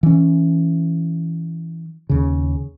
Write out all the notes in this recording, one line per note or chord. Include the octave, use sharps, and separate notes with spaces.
E3 C#4
D#2 C#3